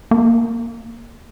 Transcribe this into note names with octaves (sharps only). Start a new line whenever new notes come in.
A#3